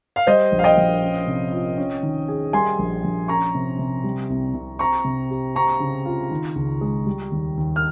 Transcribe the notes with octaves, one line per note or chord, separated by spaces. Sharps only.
F5
G3 C5 D#5
A#1
F5
D#5 G5
A#1
C#4
C3
F4
C#4
D#3
G#4
G3 G#5 C6
A#1
A#1
C#4 A#5 C#6
C3
C3
G3
C2
C2
C4 A#5 C#6
C3
G4
C4 A#5 C#6
C#3
F4
D#3
C#2
G#3
G3
D#2
D#2
F6